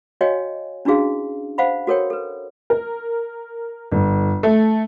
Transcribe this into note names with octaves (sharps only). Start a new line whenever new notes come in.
F#4 C#5 D#5 F5 G5 G#5
C#4 D4 E4 F#4 G#4 F5
C5 F5 F#5 B5
F#4 A4 A#4 C#5 G5
A4 B4
A#4
G1
A3